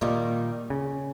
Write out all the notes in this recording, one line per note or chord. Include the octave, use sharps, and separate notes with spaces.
A#2 D#3 G3 A#3
C#3